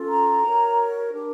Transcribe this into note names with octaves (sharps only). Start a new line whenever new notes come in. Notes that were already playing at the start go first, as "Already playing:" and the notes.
Already playing: C#4 F4 A4
A#5
F#4 A#4 C#5
D4 G4 A#4